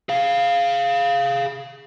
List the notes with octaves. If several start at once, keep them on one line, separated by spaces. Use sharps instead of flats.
G#4 F5